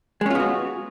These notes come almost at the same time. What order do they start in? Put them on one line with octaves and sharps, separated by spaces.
G#3 C#4 F4 B3 F#4